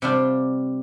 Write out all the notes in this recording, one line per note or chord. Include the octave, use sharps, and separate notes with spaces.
C3 G3 D4 F4 C5